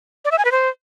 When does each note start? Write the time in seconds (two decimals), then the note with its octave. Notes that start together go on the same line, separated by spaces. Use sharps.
0.25 D5
0.32 E5
0.38 G#5
0.45 B4
0.52 C5